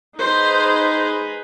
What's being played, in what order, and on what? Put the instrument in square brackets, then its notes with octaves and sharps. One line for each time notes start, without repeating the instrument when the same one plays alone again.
[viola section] D#4 G#4 B4 [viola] C5